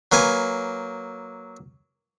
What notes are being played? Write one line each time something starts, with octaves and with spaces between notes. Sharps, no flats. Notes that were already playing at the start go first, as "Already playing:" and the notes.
F#3 A#3 B4 G#5